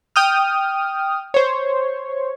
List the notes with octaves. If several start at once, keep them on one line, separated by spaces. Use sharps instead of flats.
G5 D#6 F6
C5 C#5